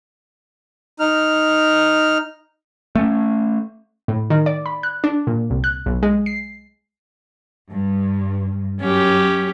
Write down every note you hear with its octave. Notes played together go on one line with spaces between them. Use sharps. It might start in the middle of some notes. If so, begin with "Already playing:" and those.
D#4 F6
A3 C#4
A2
D#3
D5
B5
F#6
D4
A#2
C2
F#6
B1
G#3
C7
G2
F#2 C#4 G4